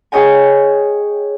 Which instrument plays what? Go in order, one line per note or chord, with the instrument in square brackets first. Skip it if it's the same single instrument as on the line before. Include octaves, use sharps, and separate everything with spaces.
[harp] G#4 C#5 D#5 G5 G#5